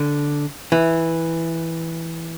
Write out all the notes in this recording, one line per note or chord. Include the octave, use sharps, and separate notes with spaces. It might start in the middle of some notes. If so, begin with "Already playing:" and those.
Already playing: D3
E3